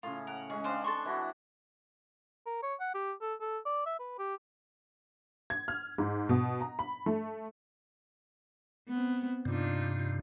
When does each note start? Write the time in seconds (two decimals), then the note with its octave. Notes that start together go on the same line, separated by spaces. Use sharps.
0.03 A2 C#3 F4
0.27 A#4 F#5
0.50 G#3 C#4 G#4
0.64 C4 D4 C5 D#5 F5
0.84 A4 C6 C#6
1.05 E3 E4 F#4
2.46 A#4
2.63 C#5
2.80 F#5
2.94 G4
3.22 A4
3.41 A4
3.66 D5
3.86 E5
4.00 B4
4.19 G4
5.50 G#6
5.68 F6
5.98 G#2
6.29 B2
6.61 A#5
6.79 B5
7.06 A3
8.88 B3 C4
9.45 G2 C3 D4 D#4 F4